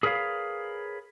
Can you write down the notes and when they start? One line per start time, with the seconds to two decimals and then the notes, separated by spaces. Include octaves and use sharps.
0.03 G#4 A#4 B4 C#5 F5